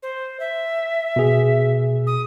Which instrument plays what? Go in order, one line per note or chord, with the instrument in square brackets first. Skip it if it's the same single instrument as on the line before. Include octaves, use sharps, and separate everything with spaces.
[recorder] C5
E5
[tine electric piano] B2 G#4
[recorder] D#6